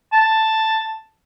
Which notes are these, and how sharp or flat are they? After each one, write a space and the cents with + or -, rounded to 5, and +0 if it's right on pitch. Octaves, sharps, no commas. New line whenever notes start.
A5 +5